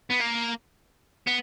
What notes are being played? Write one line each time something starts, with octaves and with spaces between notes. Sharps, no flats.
B3
A#3
B3